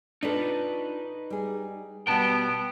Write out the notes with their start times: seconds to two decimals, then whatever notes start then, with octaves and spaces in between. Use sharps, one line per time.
0.23 D4 D#4 F4 A4 B4
1.30 G3 G#4
2.07 B2 G3 B3 G5 A5